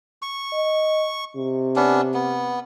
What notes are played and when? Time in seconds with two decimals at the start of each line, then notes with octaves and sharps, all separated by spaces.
0.22 C#6
0.52 D#5
1.36 C3
1.76 B3 C#4 D4
2.14 B3